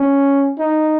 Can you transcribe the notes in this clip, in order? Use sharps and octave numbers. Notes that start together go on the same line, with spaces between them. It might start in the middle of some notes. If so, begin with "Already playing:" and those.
Already playing: C#4
D#4